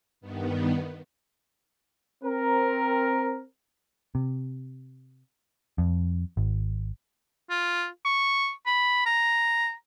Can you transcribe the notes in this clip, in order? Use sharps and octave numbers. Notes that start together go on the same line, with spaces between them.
G2 D#3 B3
C4 A#4
C3
F2
G#1
F4
C#6
B5
A#5